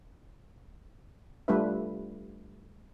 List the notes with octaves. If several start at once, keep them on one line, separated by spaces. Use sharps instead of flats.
G3 A3 D4 F4 B4 E5